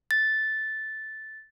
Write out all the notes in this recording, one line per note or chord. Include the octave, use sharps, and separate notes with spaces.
A6